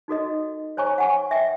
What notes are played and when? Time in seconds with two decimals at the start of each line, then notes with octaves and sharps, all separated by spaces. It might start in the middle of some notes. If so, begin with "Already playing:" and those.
0.08 D#4 F#4 A4 D#5
0.77 C5 C#5 G#5 A#5 C#6
0.98 F#5 G#5 C#6
1.31 E5 G5